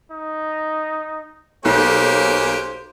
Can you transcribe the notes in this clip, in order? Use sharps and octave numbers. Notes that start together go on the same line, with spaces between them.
D#4
B1 A#3 C#4 G4 C5